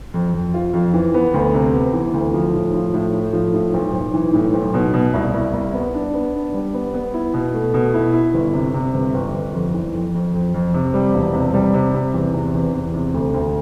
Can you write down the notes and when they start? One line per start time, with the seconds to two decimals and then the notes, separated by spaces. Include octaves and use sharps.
0.14 F2
0.34 F2
0.54 F4
0.73 F2
0.94 E3
1.14 B3
1.34 D2
1.54 C3
1.73 B3
1.93 E3
2.13 D2
2.34 F3
2.54 A2
2.74 F3
2.94 A2
3.14 A3
3.33 F3
3.54 A2
3.74 B1
3.94 B1
4.14 E3
4.33 A2
4.54 B1
4.74 B2
4.94 B2
5.14 C2
5.34 C2
5.54 C2
5.74 B3
5.94 D4
6.14 B3
6.34 D4
6.54 G3
6.74 B3
6.94 B3
7.14 E4
7.34 B2
7.54 A3
7.74 B2
7.94 E4
8.13 E4
8.34 G1
8.54 C3
8.74 C3
8.94 G1
9.14 G1
9.34 G1
9.54 F2
9.74 E3
9.94 F2
10.14 F2
10.34 F2
10.54 F2
10.74 C3
10.94 G3
11.14 E1
11.34 C3
11.54 G3
11.74 C3
11.94 C3
12.14 E2
12.34 C3
12.54 E2
12.74 E2
12.94 C3
13.14 D2
13.34 D2